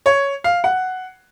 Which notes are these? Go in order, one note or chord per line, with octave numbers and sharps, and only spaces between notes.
C#5
F5
F#5